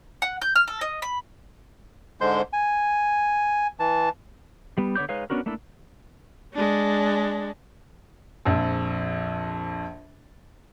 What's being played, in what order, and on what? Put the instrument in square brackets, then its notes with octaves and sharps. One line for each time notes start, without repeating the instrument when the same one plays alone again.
[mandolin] F#5
G6
F6
A4
D#5
B5
[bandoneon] G#2 D3 G#3 C5 C6 G6
G#5
E3 A5
[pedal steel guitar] G3 B3
D3 B3 C#5 D6 G6
G#3 D#4 B4 C#5 F5
B3 C#4 D4 F#4 A#4
A3 A#3 D4 E4 A4
[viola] G#3 D4
[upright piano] A#1 F2